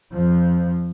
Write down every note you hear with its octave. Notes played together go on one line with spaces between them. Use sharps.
F2 F3